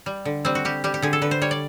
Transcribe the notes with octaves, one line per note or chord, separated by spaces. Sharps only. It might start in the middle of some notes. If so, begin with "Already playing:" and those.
G3
D3
G3 C4
F#4
G3 G4
G3 G4
G4
D3 G#4
A4
D3 B4
C5
G3 C#5
D5